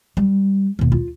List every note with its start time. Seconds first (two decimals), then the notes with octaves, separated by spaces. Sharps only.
0.17 G3
0.79 D#2 B2
0.92 F4